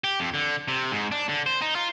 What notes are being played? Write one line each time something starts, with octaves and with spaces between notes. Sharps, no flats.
G4
F2
D3
C3
G#2
D4
D3
C5
D#4
F4